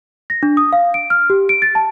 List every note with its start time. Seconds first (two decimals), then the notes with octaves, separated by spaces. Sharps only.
0.30 A#6
0.43 D4
0.57 D#6
0.73 F5
0.94 D7
1.10 F6
1.30 G4
1.49 D7
1.62 A6
1.75 A5